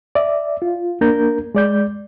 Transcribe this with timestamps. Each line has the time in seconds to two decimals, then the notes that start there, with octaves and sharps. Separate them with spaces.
0.15 D5 E5
0.62 F4
1.01 A#3 D4 A#4 A#5 G6
1.55 G#3 D5 G6